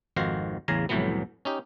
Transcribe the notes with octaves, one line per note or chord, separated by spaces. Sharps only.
G#1 F2 D#3 F#4 C5 F5
A1 E2 C#3 F5 G#5 A#5
C2 F2 A2 E3 F#3 B3
C#4 D#4 G4